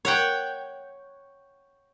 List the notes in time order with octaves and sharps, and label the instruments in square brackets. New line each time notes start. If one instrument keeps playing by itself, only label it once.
[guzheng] C#5 F#5 G5